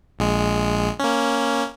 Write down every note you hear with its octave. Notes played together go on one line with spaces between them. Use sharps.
A#1 G#3
A#3 C#4